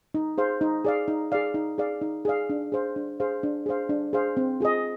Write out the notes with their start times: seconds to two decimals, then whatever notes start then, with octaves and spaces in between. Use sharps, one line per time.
0.14 D#4
0.38 G#4 C5 F5
0.61 D#4
0.85 G#4 D5 F5
1.08 D#4
1.32 G#4 D5 F5
1.54 D#4
1.78 G#4 D5 F5
2.01 D#4
2.25 G#4 D5 F5
2.50 D4
2.72 G#4 C5 F5
2.96 D4
3.20 G#4 C5 F5
3.43 D4
3.66 G#4 C5 F5
3.89 D4
4.13 G#4 C5 F5
4.37 C4
4.60 F4 G#4 D#5